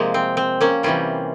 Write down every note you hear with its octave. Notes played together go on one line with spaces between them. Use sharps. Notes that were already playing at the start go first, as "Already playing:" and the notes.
Already playing: C3 F3 G#3 A#3
C4
C4
A#3 C#4
C3 E3 G3 C#4 F4